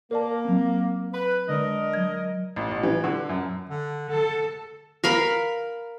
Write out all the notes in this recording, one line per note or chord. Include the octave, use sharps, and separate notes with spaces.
A#3 A#4 D5 A5
F#3 C4
B4
D3 G#3 D4 A#4 D#5
F#3 G#6
A1
A1
E3
D3
F#2
D3
D3 A4
A#4 F5 B5